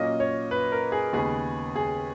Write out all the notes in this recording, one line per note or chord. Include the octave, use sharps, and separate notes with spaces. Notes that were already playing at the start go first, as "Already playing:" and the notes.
Already playing: A#2 F#3 A#3 C#4 D#5
C#5
B4
A#4
G#4
D#2 C#3 G#3 B3 G#4
G#4